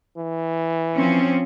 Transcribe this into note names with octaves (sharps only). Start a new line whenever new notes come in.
E3
F3 C4 C#4